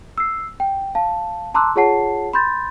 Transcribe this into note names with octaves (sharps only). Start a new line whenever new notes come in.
E6 C7
G5
F5 A5
A5 A#5 C6 D6 E6 F#6
F4 G#4 C#5 F#5 A5 C7
B5 C6 G6 A6